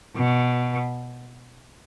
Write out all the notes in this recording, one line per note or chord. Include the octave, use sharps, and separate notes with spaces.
B2